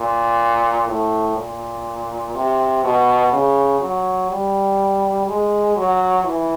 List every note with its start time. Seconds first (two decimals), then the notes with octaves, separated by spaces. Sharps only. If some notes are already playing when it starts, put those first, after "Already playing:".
Already playing: A#2
0.88 A2
1.37 A#2
2.35 C3
2.84 B2
3.33 C#3
3.81 F#3
4.30 G3
5.27 G#3
5.77 F#3
6.24 E3